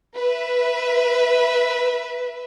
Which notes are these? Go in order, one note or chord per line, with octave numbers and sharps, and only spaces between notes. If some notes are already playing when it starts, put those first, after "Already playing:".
B4 E5